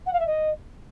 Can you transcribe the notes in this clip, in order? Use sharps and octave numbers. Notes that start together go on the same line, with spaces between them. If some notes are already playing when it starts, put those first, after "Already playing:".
F#5
F5
E5
D#5